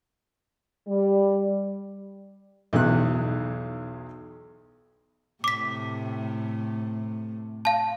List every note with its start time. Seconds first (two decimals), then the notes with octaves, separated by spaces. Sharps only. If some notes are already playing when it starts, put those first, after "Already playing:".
0.87 G3
2.73 B1 E2 D#3 F#6
5.44 A2 C3 A3 D6 B6
7.65 F5 A5